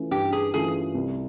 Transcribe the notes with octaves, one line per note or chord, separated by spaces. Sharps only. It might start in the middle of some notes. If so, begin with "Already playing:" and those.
Already playing: E3 A3 C#4 F4
G2 G4
G#4
E3 A3 C#4 F4 G#4
C2